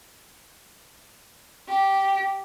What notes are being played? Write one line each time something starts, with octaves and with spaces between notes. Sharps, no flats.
G4